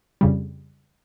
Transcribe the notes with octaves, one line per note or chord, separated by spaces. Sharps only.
F2 C#3 G3